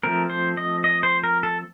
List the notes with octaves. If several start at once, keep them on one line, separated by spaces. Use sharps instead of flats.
F3 A3 C4 A#4
C5
D#5
D#5
C5
A#4
A4